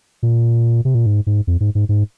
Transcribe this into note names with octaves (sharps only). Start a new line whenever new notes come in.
A#2
C3
A#2
G#2
G#2
F2
G#2
G#2
G#2